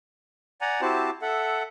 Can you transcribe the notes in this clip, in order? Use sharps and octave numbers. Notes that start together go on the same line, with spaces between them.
D5 F#5 G#5 A#5
C4 E4 F#4 G4 C5 A5
A4 E5 F#5